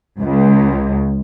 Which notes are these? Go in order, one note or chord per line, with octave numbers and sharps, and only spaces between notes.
C#2